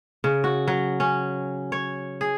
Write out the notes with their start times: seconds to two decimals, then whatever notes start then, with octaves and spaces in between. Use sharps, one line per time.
0.24 C#3
0.44 F#4
0.68 F#3
1.00 C#4
1.72 C#5
2.21 G#4